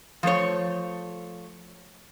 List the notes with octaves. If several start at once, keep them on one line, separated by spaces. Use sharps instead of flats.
F3 A3 C5 C#5